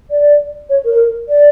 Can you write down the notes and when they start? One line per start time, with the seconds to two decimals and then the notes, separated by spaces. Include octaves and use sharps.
0.11 D5
0.70 C#5
0.85 A#4
1.29 D5